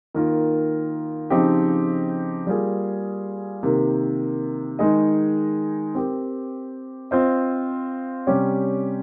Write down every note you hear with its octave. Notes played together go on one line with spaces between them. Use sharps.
D#3 A#3 F4
C#3 F3 C4 D#4 G4
G3 A#3 F4 G#4
C3 D#3 A#3
D#3 G#3 D#4 G#4 D#5
C4 G4 A#4
C4 F4 C5 D#5
C3 G3 C#4 G4 C#5